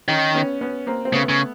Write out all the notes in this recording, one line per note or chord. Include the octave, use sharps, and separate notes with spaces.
D#3 C#4 D#4
B3 C#4
B3 C#4
A#3 C4
C4
C#3 A3 B3
C#3